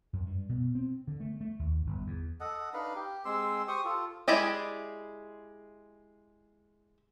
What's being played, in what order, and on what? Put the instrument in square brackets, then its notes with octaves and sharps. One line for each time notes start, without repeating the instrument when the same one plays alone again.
[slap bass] F#2
G2
B2
C4
D3
A3
A3
D#2
G1
E2
[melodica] A4 D#5 F#5
D4 D#4 B4 F5
G4
G#3 C4 C6 E6
G4 C5 C#6 D#6
F4 A4
[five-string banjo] G#3 E4 G4 D5 D#5